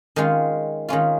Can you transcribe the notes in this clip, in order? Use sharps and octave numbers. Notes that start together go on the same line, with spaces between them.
D#3 G#3 C#4 F4
D#3 G#3 C#4 F4